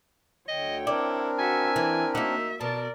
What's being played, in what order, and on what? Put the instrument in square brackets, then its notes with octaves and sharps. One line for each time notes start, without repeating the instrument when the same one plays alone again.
[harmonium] D2 D3 [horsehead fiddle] C#5 G5 [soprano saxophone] D#5
[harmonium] C4 D4 A#4 [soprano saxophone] E4 [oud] D5
[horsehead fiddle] F#4 E5 [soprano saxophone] G#5
[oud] E3 [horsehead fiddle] E4
[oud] A#3 F#4 [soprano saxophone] D#4 [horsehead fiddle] E5
[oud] B2 [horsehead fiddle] A#4 D5 [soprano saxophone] A5